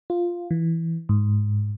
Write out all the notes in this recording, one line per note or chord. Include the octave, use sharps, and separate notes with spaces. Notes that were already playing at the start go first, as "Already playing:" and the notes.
F4
E3
G#2